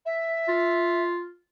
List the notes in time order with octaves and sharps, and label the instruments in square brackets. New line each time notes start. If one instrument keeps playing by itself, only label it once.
[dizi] E5
[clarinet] F4